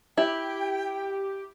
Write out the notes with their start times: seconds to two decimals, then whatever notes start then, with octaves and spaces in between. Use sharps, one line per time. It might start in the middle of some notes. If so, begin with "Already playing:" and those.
0.18 E4 G4 G5